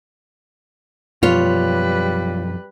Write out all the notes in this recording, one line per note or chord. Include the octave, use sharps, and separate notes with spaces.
F#2 B2 F3 G3 F4 B4 C#5